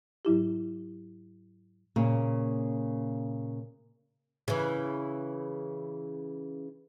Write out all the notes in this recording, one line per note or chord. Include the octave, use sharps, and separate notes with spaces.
G#2 F#3 E4 G4
A#2 C#3 A#3
C#3 E3